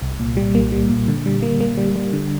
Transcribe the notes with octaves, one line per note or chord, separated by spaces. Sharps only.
C2
A#2
G3
A#3
G3
A#2
D3
G3
A#3
A#3
G3
G3
D3